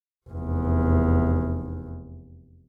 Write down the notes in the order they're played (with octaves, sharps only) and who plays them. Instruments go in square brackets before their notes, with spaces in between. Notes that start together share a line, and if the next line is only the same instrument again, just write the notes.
[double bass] F1 E2